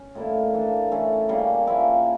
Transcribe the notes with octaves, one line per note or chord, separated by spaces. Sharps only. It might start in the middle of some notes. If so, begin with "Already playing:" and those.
Already playing: C#4
A2 G3 A#3 E4
E3 A#3 D4 A4
E3 A3 C#4
C#3 G3 A#3 C#4
F3 A#3 C#4 E4